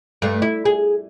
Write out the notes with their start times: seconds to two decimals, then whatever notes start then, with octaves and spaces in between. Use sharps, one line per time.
0.22 G2 A3
0.42 E4
0.65 G#4